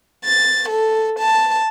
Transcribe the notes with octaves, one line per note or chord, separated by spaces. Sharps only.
A6
A4
A5